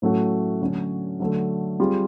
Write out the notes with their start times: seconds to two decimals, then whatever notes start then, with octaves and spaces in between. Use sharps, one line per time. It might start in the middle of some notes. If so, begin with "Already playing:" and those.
0.02 A2 F#3 A3 C#4 F#4
0.61 D3 F#3 A3 C#4
1.20 D3 F#3 A3
1.79 G3 C4 F4 G#4